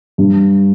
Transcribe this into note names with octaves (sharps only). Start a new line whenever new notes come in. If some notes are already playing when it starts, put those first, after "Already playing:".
G2